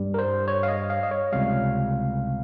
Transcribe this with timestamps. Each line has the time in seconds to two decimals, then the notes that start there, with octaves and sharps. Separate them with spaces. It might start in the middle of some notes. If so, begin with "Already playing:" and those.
Already playing: G2 G3
0.14 A#4
0.19 C5
0.48 C#5
0.63 F5
0.68 D#5
0.90 F5
1.03 D#5
1.11 C#5
1.32 C#2 C3 G3 F5